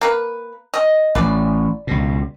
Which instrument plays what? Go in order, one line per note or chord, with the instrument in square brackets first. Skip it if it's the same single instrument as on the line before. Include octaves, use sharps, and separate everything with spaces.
[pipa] A#3 B4
D#5
[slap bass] A1 [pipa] B4 D5
[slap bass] C#2 B2